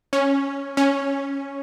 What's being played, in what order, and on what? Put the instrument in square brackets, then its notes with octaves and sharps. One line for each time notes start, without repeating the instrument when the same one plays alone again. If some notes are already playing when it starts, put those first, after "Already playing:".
[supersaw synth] C#4
C#4